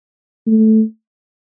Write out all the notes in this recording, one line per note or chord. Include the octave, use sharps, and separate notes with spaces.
A3